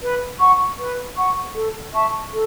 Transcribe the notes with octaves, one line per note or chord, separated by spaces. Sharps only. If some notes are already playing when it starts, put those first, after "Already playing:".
B4
F#5 C#6
B4
F#5 C#6
A4
E5 A5 C#6
A4